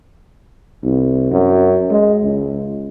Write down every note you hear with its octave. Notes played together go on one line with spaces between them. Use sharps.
C2
F#2
G#3
C#2